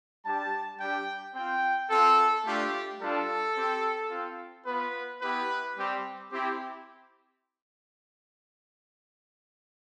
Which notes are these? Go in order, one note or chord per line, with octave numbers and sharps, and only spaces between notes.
G3 D4 G4 A5
G3 D4 G4 G5
C4 F4 G5
C4 F4 A4
A3 D4 F4 G4
G3 D4 F4 A4
C4 G4
C4 F4
B3 F4 B4
B3 E4 G4 B4
G3 C4 G4
C4 E4 G4